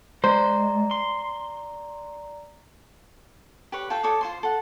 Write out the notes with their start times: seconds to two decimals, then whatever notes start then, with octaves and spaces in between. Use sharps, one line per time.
0.24 G#3 C5 D5 A#5
0.91 C6
3.72 G4 B4 C#5
3.90 F4 A4 B4 G5
4.03 A4 C#5 D6 D#6
4.21 F4 C5 C6
4.43 A4 F#5